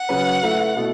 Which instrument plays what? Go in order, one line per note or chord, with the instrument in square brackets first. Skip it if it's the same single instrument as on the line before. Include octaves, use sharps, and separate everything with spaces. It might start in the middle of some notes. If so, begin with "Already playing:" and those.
Already playing: [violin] F#5
[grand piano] C#3 F#3 C#4 F#4 B4
A3 E4 B4
B2 A3 E4 A4